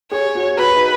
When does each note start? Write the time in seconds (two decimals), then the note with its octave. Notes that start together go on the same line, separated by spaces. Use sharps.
0.12 G#4 C#5
0.35 F#4
0.58 F#4 B4
0.75 D#4